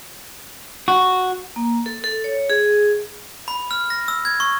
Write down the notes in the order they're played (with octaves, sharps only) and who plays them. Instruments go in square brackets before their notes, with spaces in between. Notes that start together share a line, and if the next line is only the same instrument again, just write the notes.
[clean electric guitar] F#4
[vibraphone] A#3
A4
A4
C#5
G#4
[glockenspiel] B5
F6
A#6
E6
G#6
C#6